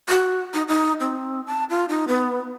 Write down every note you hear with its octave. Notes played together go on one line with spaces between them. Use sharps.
F#4
D#4
D#4
C4
A5
F4
D#4
B3